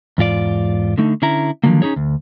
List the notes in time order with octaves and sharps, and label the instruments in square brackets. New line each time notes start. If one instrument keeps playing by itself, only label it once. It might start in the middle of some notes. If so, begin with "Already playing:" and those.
[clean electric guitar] E2 G#2 F4 D5
D3 A3 D#4
D3 C#4 E4 A#5
D3 D#3 F3 F#3 A#3
C#4 D#4 G#4 C#5
D2